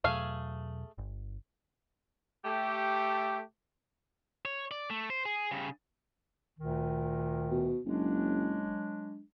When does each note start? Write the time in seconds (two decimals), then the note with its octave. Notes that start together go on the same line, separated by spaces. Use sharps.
0.04 E2 B2 F#3 A3 G#4 F5
0.98 G1
2.45 A3 G4
4.45 C#5
4.71 D5
4.90 A3
5.10 C5
5.25 G#4
5.52 C#3 G3
6.59 D2 A#2 D#3
7.50 B2
7.85 F#1 F#3 G#3 D4